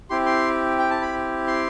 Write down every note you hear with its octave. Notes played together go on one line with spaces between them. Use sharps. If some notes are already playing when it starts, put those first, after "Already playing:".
C4 E4 G4 C6
C6
G5
A5
B5
C6